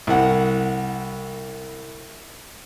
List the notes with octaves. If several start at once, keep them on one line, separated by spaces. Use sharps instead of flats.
C2 F#5